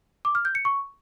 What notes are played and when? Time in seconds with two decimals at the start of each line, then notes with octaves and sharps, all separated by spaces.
0.25 D6
0.35 F6
0.45 G6
0.55 C#7
0.65 C#6